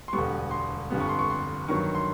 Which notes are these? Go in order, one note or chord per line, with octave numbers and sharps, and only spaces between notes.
C6
E1 D2 D3 G3 B3 C#6
C6
G1 F2 D3 G3 B3
C#6
C6
C#6
C6
G2 D#3 F#3 B3 C#6
C6